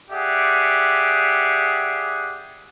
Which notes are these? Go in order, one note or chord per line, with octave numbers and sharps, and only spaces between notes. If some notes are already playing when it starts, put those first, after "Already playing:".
G4 G#4 D5 E5 F#5